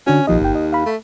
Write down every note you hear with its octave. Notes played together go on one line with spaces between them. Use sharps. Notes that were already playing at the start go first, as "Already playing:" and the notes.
D3 C#4 D4 F#4
A#1 D#2 F3 D#5
G1 G5
D#5
F5 B5
A3